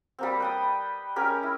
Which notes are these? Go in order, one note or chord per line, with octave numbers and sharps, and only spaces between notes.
G3 A#3 C4
B4 G5 D#6
G#3 C#4 G4 A#4
E4